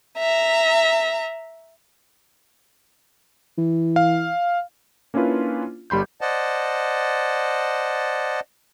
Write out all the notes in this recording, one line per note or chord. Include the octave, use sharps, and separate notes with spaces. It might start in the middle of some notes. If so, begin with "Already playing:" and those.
E5 A#5
E3
F5
A#3 C#4 D4 E4 F4 B4
G1 G3 B5 C6 G6
C5 D5 D#5 F#5 A5